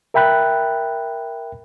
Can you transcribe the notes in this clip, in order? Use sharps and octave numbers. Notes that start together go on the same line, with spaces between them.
A#4 E5 G5 B5 F#6